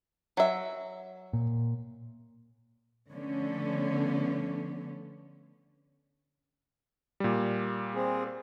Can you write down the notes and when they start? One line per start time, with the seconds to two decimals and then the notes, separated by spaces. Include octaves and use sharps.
0.37 F#3 E5
1.33 A#2
3.10 D3 F3 A3 B3 C#4
7.20 A#2 G3
7.94 C4 G#4